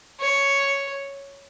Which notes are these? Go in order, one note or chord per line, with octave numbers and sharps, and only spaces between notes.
C#5